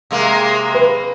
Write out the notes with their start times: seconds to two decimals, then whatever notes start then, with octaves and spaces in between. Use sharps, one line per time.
0.11 C3 G#3 A#3
0.74 B4